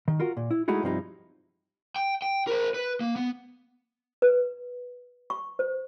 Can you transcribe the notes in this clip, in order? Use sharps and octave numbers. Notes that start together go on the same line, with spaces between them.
D#3
F4 F#4 A#4
A#2
E4
G#3 A3 D#4 E4 F#4 G#4
G2 C3 F3 D#4 E4
G5
G5
A#4 C5
B4
A#3
B3
B4
C#6
C5